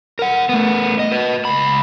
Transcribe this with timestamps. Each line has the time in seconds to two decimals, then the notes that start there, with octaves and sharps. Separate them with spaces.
0.19 A#4 F#5
0.49 A3 B3
0.99 D#5
1.12 B4 D#5
1.45 C#2 B5